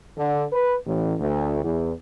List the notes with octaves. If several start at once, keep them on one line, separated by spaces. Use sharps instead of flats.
D3
B4
A1
D2
E2